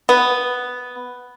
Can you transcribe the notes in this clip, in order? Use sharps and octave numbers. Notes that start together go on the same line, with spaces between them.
B3